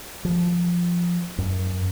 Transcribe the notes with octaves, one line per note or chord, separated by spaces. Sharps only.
F3
F#2